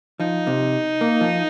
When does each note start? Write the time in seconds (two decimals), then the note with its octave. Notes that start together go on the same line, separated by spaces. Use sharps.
0.20 F3 D#4
0.47 C3
1.01 A#3
1.21 F3